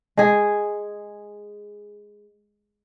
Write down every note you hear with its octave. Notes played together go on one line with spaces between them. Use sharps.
G#3 G#4